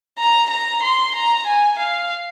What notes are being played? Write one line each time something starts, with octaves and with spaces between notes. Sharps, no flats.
A#5
A#5
C6
A#5
G#5
F5